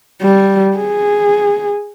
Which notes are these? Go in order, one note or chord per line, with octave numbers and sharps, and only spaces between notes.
G3
G#4